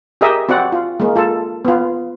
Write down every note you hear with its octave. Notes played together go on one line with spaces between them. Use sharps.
G4 G#4 A#4 D#5 E5
C4 F#4 D5 F#5
F4
G#3 A#3
F4 A4
B3 F4